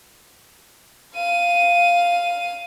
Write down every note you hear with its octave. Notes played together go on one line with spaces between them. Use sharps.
F5 D#7